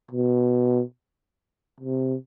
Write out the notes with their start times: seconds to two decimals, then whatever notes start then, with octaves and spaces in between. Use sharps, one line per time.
0.11 B2
1.80 C3